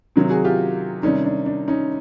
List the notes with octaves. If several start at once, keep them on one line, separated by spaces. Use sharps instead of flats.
C3 D#3 F#3
F#4 G#4
F4 G4
C3 D#3 G3 C#4 D#4
D4
D4
C#4 D#4